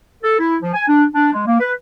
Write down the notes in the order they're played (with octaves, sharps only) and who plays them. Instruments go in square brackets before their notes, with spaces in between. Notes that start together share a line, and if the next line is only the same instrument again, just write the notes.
[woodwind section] A4
E4
F3
G#5
D4
D4
G#3
A#3
B4